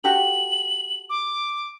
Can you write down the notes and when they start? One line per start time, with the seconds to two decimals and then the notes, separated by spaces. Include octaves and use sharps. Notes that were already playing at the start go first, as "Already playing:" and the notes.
0.04 F#4 G4 A4 F#7
1.10 D6